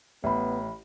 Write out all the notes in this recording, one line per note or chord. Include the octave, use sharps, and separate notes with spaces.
A1 B3 E5 B5